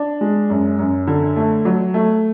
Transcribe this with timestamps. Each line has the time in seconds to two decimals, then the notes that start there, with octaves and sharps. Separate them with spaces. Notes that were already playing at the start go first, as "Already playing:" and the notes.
Already playing: D4
0.21 G#3
0.50 F#2
0.79 F#2
1.07 D3
1.36 A3
1.65 F#3
1.94 A3